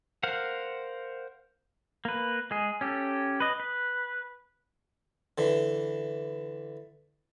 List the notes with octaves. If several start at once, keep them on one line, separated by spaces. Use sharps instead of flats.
A#4 C5 F5 F#5
A#3 B4
G#3 G#4
C#4 G4 A4
B4 D#5
B4
D3 E3